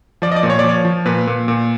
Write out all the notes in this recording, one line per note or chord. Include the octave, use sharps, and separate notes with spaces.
F3 D5
D#5
D5
A#2
C#5
D5
F3
C#5
F3
A#2 B4
A#2
A#2